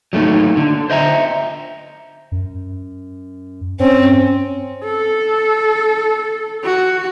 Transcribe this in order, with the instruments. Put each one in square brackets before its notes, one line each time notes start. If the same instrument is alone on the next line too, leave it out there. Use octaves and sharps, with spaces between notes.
[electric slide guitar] F#3 A3 A#3 D#4 F#4
D3
C5 D#5 E5 A#5
[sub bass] F#2
[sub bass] G2 [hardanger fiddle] C4 C#4
[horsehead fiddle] A4
F#4